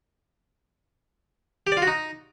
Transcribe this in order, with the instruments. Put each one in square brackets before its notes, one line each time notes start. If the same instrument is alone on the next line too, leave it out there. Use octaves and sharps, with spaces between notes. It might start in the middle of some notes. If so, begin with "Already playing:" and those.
[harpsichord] G4
D5
F4
F#4
D#4